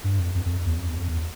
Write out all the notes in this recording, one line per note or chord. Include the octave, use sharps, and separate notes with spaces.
G2
F2
F2
F2
E2
F2
E2
F2
E2